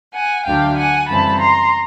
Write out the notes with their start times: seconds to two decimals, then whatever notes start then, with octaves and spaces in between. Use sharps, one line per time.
0.14 F#5 G#5
0.46 D2 D3 F#3 A3 D4 F5 G5
0.77 F#5 G#5
1.08 F#2 C#3 E3 G3 C4 A5 B5
1.40 A#5 C6